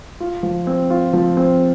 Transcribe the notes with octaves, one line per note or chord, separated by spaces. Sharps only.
F4
F3
C4
F4
F3
C4